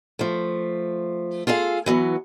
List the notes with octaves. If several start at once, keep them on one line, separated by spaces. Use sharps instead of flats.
F3 A3
F4 G#4 A4 F5
E3 F#3 B3